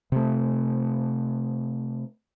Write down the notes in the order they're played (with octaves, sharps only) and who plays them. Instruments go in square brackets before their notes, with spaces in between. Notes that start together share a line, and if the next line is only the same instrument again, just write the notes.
[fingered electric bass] C3 A3